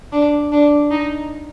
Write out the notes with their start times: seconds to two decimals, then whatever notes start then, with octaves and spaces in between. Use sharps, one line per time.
0.12 D4
0.52 D4
0.91 D#4